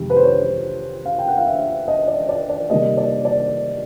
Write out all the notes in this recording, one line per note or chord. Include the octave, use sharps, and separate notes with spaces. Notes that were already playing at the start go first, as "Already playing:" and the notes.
Already playing: F2 C3 D#3 G#3
B4
C5
C#5
F5
G5
F#5
F5
E5
D#5
D5
D5
D5
C3 D#3 G3 A#3 D#5
D5
D5